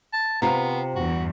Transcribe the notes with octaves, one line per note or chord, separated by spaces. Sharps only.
A5
C3 B3 F4 A#5
E2 G2 F#4